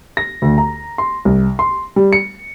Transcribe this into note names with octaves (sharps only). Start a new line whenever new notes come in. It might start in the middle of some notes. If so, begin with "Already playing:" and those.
A#6
D2
A#5
C6
C2
C6
G3
C#7